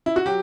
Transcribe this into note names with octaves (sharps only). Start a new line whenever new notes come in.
E4
F#4
F#3 G4